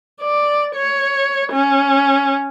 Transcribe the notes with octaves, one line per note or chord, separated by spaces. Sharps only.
D5
C#5
C#4